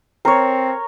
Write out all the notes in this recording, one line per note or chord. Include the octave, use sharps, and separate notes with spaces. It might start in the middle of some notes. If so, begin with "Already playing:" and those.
C4 A#4 C#5